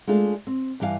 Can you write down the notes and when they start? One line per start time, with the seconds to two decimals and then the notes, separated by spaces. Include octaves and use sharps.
0.07 G#3 A3 D4 F4 G#4
0.47 C4
0.80 G2 E3 G3 F#4 F5 G#5